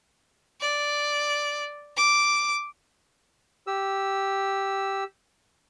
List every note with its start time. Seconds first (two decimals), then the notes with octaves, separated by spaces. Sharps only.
0.61 D5
1.97 D6
3.67 G4 E6